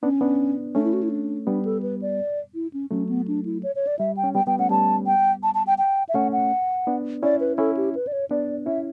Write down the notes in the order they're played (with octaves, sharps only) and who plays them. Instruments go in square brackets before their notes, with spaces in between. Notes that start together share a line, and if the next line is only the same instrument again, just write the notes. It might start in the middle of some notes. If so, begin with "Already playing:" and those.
[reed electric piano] B3 D4 [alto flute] C#4
[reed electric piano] B3 D4
[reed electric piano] A3 C#4 [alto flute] D4
[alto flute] E4
F#4
E4
D4
[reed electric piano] G3 B3 [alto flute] D4
[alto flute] A4
B4
D5
E4
C#4
[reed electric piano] F#3 A3 [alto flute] C#4
[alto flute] B3
D4
E4
C#5
C#5
D5
[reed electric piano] G3 [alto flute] E5
[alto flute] G5
[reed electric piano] C#4
[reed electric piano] G3 B3 [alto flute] G5
[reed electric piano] G3 B3 [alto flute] G5
[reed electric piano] A3 C#4 [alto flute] F#5
[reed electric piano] G3 B3 [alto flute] A5
[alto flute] G5
A5
A5
G5
G5
E5
[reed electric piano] A3 C#4 [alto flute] F#5
[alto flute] F#5
[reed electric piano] B3 D4
[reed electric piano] C#4 E4 [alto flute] D5
[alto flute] B4
[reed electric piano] C#4 E4 [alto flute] A4
[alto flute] G4
B4
D5
C#5
[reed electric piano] B3 D4 [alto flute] D5
[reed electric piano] C#4 E4 [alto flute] E5